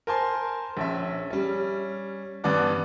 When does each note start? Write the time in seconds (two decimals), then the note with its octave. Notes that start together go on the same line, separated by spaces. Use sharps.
0.07 A#4 C5 G#5 A5 C6
0.77 A#1 C#4 E5
1.30 G3 C#4
2.44 G2 E3 B3 D4 D5 F#5